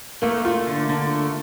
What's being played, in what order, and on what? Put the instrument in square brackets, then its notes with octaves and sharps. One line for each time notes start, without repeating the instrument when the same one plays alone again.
[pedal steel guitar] A3 [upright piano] A#3
[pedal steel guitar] A3 [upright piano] F4
[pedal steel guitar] D3
D3
A3